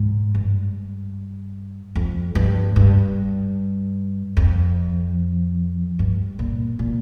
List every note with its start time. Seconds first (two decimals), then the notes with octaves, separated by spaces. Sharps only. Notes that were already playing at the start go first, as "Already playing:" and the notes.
Already playing: G#2
0.35 G2
1.96 F2
2.35 G2
2.76 G2
4.37 F2
5.99 G2
6.39 A#2
6.79 A#2